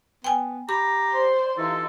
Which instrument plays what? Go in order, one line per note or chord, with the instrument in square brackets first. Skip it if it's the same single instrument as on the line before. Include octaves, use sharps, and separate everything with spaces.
[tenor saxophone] B3 [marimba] G5 G#5
[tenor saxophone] G4 [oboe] A#5 [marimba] B5
[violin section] C5 D5 C6
[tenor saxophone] E3 [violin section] D#4 F4 G4 [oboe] A4